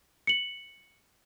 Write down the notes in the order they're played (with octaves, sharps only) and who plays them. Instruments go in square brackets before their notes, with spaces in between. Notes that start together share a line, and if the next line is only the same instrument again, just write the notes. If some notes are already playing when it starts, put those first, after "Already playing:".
[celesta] C#7 F#7